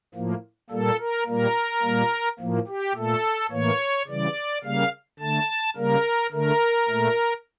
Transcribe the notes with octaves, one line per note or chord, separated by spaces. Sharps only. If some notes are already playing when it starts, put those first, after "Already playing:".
A2 F3 A#3
A#2 G3 A#3 A4
A#4
A#2 G3 A#3 A#4
A#2 G3 A#3
A2 F3 A#3
G4
A#2 A3 A4
A2 E3 A#3 C#5
C#3 E3 G3 D5
C#3 G3 A#3 F5
D3 A3 A5
C#3 G3 A#3 A#4
D3 A3 A#4
A#2 A3